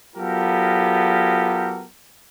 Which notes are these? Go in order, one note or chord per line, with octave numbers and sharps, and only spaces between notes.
F#3 B3 F4 G4 A4 A#4